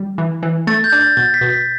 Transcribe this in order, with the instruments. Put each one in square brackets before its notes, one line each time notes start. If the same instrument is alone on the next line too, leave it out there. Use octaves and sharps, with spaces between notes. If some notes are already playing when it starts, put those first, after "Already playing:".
Already playing: [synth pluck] G3
E3
E3
[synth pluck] A3 [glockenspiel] A6
[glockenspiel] G6
[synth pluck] D4
[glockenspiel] A6
[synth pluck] B2 [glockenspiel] A6
[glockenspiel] B6
[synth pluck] B2
[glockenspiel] B6